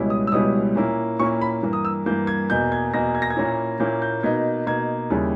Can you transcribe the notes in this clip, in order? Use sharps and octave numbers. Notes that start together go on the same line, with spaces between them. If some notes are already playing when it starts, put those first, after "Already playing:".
Already playing: C#2 B2 G3 C#4 E4
D#6
E6
C#2 B2 G3 C#4 E4 D#6
A#2 A#3 C#4 E4
A#2 A#3 C#4 E4 C#6
B5
G2 E3 A#3
D#6
E6
G2 E3 A#3 G6
G#6
E2 B2 A#3 G6
G#6
E2 B2 A#3 A#6
G#6
A#6
G#6
A#2 A#3 C#4 E4
A#2 A#3 C#4 E4 G6
G6
B2 A#3 D#4 G#6
B2 A#3 D#4 G#6
D#2 C#3 G3 C#4 E4